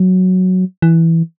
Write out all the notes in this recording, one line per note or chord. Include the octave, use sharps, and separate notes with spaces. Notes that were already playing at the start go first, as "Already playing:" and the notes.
Already playing: F#3
E3